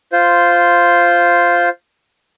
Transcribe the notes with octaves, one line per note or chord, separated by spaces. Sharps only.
F4 C5